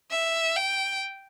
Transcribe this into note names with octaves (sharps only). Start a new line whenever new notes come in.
E5
G5